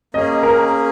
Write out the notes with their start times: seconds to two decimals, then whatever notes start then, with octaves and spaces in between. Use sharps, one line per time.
0.14 A#3 C#4 G#4 D#5
0.43 A#4